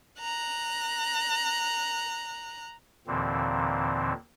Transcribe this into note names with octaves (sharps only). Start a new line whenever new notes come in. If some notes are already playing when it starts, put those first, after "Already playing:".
A#5 F#6
D#2 A#2 D3 E3 C4